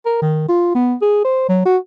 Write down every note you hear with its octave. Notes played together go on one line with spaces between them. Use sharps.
A#4
D#3
F4
B3
G#4
C5
F#3
F#4